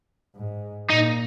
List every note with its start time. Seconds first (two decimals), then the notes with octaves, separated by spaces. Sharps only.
0.36 G#2
0.90 A#2 D#4